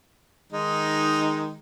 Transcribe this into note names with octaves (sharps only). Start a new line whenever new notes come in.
D#3 G#3 D#4